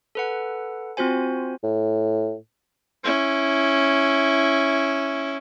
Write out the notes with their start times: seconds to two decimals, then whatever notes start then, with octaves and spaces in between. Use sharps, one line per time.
0.15 A4 B4 F#5
0.97 C4 F4 F#4 C5 G#5
1.63 A2
3.04 C#4 E4